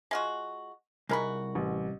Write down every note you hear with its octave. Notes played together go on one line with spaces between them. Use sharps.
G#3 F4 F#4
C2 G#3 D#4 F#4 A#4 B5
A1